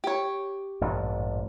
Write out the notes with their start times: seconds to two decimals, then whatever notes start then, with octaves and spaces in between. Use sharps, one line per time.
0.04 G4 C#5
0.81 A1 G2 A#2